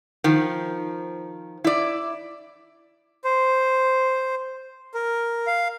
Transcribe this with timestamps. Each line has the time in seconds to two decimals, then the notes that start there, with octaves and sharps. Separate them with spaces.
0.24 D#3 F3
1.64 E4 D5
3.24 C5
4.94 A#4
5.47 F5